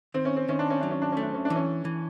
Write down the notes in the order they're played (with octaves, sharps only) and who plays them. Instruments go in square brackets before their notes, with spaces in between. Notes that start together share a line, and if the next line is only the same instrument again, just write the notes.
[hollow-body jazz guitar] D#3 [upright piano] C4
[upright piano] C#4
C4
[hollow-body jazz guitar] D#3 [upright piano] C#4
[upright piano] D4
C#4
[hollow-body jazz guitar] F#3 [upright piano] D4
[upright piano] C#4
D4
[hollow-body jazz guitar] A3 [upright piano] C#4
[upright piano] D4
C#4
D4
[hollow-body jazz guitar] E3
[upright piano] C#4
[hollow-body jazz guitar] E3